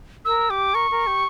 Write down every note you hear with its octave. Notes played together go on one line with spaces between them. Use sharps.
A#4 E6
G4 D6
A#4 C#6
A#4
G4